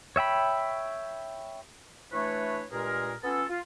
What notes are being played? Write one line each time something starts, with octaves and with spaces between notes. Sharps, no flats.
C#5 E5 G5 B5
E3 A3 D4 B4 C#5
G2 A#2 G#3 G#4 A#4
B3 C#4 F4 A4
F4